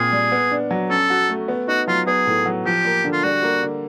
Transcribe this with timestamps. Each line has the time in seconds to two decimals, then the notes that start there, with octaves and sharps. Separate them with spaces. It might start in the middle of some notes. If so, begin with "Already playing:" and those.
Already playing: A#2 C4 G#4
0.12 G3
0.32 B3
0.51 D4
0.71 F#3
0.90 C#4 A4
1.10 F#4
1.29 A3
1.48 B3
1.68 D#4 F#4
1.88 F#3 F4
2.07 B3 G#4
2.27 A2
2.46 F#3
2.65 F3 G4
2.85 A#3
3.04 D3
3.12 F4
3.23 G3 F#4
3.43 A#3
3.63 D3